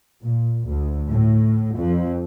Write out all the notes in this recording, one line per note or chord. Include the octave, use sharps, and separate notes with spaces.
A#2
D2
A2
F2